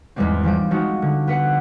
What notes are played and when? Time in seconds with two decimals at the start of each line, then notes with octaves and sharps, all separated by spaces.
0.16 E2 G#2 E3 G3 G#3 C4
0.43 E3 F3 G3 G5
0.71 F3 G#3 C4 D#4 F#4
1.02 D3
1.27 B3 B4 F#5